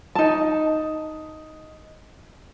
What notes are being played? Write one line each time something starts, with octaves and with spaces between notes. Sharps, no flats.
D#4 A5